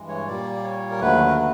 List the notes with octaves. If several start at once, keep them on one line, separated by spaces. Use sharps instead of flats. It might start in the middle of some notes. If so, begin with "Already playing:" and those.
Already playing: G2 E3 G#3
C#5
A#2 G3 A#3 D5
C#5
A#4
D#2 D3 F#3 A3 B4
A#4
B4